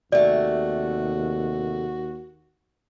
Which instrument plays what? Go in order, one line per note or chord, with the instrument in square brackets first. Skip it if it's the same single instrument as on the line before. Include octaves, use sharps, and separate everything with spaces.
[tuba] D#2 [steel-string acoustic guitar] C3 A3 [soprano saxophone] F#4 [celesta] D5